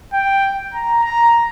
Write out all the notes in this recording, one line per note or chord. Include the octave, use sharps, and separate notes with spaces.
G5
A#5
A#5